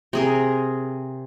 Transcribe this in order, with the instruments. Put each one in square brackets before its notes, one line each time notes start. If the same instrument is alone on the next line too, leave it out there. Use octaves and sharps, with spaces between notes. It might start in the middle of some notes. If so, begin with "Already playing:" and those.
[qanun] C3 G#4 A#4